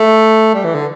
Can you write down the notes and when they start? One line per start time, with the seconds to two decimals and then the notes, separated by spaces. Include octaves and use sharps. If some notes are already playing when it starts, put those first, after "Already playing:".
Already playing: A3
0.54 G3
0.64 E3
0.75 D3